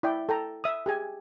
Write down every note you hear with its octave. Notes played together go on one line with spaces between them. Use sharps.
E4 D5 G5
A4 G5 A#5
E5 D#6
G4 G#4 G#5